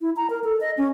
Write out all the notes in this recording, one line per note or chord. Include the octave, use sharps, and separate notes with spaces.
E4
A#5
A#4
A4
D#5
C#4